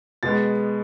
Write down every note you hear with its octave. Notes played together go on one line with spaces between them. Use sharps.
B2 G#3 B3 A6